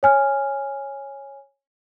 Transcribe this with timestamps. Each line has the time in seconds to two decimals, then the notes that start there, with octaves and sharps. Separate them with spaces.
0.03 C#5 G#5 F6